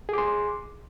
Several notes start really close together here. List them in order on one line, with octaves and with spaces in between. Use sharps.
G#4 D6 C6